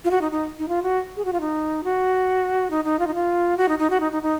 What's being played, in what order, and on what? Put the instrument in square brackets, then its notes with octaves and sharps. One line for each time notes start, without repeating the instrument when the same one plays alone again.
[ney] F4
F#4
D#4
D#4
D#4
F4
F#4
G#4
F#4
F4
D#4
F#4
D#4
D#4
F4
D#4
F4
F#4
D#4
D#4
F#4
D#4
D#4
D#4